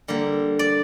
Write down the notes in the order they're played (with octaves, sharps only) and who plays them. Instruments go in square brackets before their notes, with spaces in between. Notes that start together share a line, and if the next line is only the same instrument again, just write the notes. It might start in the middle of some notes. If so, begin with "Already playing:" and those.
[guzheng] D3 G3 A#3
D5